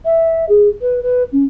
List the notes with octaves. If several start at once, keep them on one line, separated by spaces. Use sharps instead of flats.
E5
G#4
B4
B4
C#4